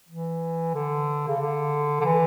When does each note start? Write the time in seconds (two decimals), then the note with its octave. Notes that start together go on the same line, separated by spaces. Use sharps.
0.09 E3
0.74 D3
1.28 C#3
1.40 D3
2.01 D3
2.04 E3